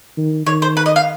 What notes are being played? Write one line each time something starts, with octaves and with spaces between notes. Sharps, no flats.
D#3
D#3 C#5
C5
B4
D#5
F5